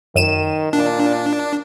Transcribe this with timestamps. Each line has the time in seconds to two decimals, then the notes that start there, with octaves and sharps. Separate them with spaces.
0.15 F#2 D#3 D#7 E7
0.73 A#2 D4